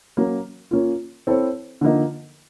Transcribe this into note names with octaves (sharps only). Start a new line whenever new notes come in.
F#3 A#3 C#4
A#3 C#4 F4
C4 E4 A4 C#5
D3 F3 A#3 D#4